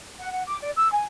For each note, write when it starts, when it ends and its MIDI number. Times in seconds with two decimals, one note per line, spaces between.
0.18 0.31 78
0.32 0.43 78
0.46 0.59 86
0.62 0.70 74
0.76 0.89 88
0.92 1.04 80